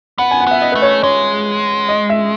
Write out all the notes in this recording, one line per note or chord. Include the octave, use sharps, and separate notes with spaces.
B3 F#5
G#5
F#5
B3 E5
D#5
A3 B4
C#5
G#3 C#5
D#5
E5